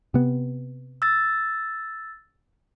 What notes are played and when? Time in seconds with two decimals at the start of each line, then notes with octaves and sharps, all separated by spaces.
0.14 C3 B3
1.02 E6 A6